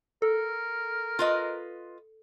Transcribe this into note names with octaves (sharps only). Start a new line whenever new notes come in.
A4 A#4
F4 B4 D#5